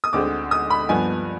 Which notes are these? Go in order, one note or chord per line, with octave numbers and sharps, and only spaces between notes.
D#6
D2 D3 G#3 C4 D6
D#6
B5
G2 F3 B3 G#5